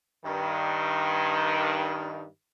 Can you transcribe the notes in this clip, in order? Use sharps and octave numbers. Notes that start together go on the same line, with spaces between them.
G2 D#3